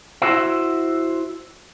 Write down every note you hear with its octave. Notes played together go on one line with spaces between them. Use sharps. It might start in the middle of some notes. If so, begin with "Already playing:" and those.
E4 F#4 C5 E5